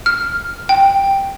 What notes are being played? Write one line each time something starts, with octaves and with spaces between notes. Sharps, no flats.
F6
G5